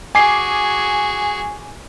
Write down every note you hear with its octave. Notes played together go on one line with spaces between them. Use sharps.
F#4 G#4 G#5 D6 C7